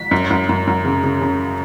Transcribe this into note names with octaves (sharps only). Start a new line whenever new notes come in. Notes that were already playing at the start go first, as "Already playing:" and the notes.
Already playing: B6
F#2
F#2
F#2
F#2
C#3
C#3
C#3